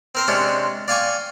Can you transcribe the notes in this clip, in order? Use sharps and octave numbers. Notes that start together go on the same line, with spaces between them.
C4 A#4 C5
C3 G#3 C#4 D4
D5 F5 G5 G#5 C#6 D6